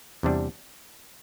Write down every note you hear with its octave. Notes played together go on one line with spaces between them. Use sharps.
E2 C3 G3 D4